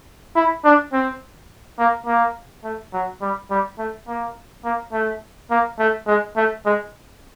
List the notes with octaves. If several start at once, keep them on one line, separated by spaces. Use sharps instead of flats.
E4
D4
C4
A#3
A#3
A3
F#3
G3
G3
A3
A#3
A#3
A3
A#3
A3
G#3
A3
G#3